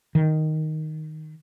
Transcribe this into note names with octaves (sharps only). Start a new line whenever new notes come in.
D#3